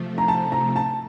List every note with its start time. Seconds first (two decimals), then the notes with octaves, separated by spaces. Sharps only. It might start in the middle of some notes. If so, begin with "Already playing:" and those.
Already playing: C3 F3 A3
0.18 A#5
0.28 A5
0.52 A#5
0.76 A5